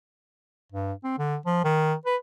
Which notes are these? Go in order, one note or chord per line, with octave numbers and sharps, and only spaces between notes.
G2
C4
D3
F3
D#3
B4